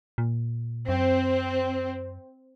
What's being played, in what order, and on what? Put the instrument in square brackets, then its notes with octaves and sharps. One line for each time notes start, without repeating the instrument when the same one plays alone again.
[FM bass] A#2
[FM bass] F#2 [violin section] C4